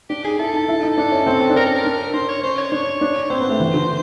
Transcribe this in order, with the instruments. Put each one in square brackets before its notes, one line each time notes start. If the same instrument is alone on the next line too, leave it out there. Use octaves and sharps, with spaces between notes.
[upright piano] D4 [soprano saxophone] G4
[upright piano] D#4 [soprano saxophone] G#4
[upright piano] E4 [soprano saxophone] A4
[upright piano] D#4
E4
D#4
[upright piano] D4 [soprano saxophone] A4
[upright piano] C#4
C4
C4
D4
[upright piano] C#4 [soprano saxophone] A#4
[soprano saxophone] A4
A#4
[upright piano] D4
[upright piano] D4 [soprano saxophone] C5
[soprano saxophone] C#5
[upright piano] C#4 [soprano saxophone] C5
[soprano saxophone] C#5
[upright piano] D4 [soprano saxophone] C#5
[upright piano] D4
[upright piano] C4 [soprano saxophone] C5
[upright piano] B3
A3
E3
D3